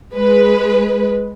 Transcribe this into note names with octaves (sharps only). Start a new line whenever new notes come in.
G#3 B4